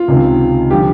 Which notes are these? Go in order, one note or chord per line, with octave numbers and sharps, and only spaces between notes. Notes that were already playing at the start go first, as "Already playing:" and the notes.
Already playing: F4
C#2 C3 D#3
D3 F3 G4